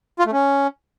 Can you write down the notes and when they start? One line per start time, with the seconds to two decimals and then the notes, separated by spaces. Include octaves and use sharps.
0.19 F4
0.26 A3
0.33 C#4